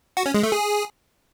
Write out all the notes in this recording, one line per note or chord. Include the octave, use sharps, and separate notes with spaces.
F#4
C#4
G#3
A3
G#4